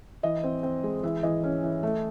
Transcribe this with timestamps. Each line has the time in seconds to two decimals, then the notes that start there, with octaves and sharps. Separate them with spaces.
0.23 E3 D#5
0.44 C4
0.63 C4
0.84 G#3
1.03 E3 E5
1.23 E3 D#5
1.43 C#4
1.63 E3
1.83 A3